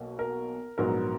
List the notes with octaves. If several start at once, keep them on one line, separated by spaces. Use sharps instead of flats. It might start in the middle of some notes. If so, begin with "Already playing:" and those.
Already playing: B1 B2 A#3
A#4
A#1 G#2 F#3 B3 A#4